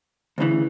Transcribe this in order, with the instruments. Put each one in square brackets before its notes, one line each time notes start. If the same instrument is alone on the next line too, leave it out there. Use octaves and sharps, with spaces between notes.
[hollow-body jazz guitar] D2 C#3 E3